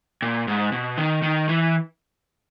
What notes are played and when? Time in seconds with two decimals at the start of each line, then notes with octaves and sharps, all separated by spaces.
0.22 A#2
0.48 G#2
0.72 B2
0.98 D#3
1.23 D#3
1.49 E3